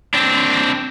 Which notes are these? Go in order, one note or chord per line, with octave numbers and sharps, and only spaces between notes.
C4 D4